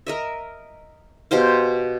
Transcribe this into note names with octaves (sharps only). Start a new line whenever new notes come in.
A#4 D#5 E5
B2 G4 C5 F5